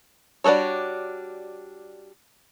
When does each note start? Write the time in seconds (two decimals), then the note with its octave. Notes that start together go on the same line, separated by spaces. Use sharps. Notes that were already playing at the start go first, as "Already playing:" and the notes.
0.44 G3 D4 F#4 A4 C#5